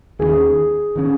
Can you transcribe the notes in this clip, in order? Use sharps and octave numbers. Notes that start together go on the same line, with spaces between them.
D#2 D#3 G#3 C#4 G#4
D#3 G#3 C#4